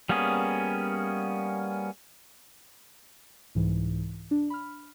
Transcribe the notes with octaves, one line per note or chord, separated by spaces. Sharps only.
G3 A#3 B3 C#4 G#4
C2 G#2 E3
D4
B5 F6